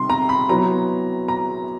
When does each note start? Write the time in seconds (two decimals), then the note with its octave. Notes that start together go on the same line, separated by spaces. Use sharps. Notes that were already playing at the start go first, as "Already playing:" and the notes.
Already playing: C3 D#3 G3 C6
0.10 A#5
0.29 B5
0.49 F#3 B3 E4 A#5
1.28 A#5